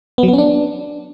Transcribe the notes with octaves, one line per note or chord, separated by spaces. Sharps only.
B3
F#3
B3
C#4
D4